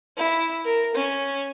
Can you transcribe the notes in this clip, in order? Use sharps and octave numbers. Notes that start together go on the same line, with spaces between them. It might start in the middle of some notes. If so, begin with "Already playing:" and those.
E4
A#4
C#4